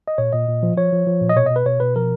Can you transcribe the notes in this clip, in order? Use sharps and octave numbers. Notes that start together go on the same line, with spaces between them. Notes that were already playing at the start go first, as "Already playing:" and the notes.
D#5
A#2 C#5
A#2 D#5
A#2
F3
F3 C#5
F3
F3
A#2
D#5
B2 C#5
D#5
B2
B4
B2 C#5
B2 B4
F3 A#4